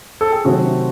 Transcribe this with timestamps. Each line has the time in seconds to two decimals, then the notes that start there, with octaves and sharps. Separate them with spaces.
0.21 A4
0.32 G#4
0.45 C3 D#3 F#3 A3 C4 F#4